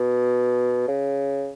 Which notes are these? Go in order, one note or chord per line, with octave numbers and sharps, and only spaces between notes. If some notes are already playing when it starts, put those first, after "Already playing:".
Already playing: B2
C#3